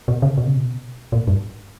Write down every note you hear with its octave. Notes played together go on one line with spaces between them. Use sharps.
B2
C#3
B2
C#3
B2
A#2
G2